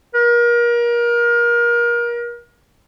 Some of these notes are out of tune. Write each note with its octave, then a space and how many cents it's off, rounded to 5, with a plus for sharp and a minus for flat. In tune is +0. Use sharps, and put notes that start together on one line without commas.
A#4 +30